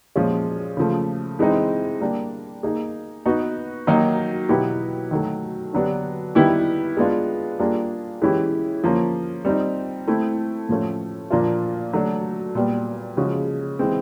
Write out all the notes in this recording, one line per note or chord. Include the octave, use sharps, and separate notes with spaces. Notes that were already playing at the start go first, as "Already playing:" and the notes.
A#2 F3 G#3 C#4 F4
C#3 F3 A3
E3 G#3 C4 D#4
G3 A#3 D4
A#3 D#4 G#4
B3 D#4 F#4
D#3 F#3 A#3 D#4
B2 F#3 B3 E4 G4
D#3 F#3 A3
D3 F#3 B3 D4 G4
D#3 G3 B3 E4 G4
G#3 B3 D4 F4
G3 A#3 D4 F4 G#4
E3 G#3 C#4 E4 G4
F3 A#3 C#4
G3 C4 D#4
A3 C4 E4
A2 F3 A3 C#4
A#2 F3 A#3 D4 F4
F#3 A3 D4
A#2 G3 B3
C#3 F3 G#3 C#4 F#4
E3 G#3 C4